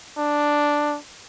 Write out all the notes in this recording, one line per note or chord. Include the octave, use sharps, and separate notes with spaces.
D4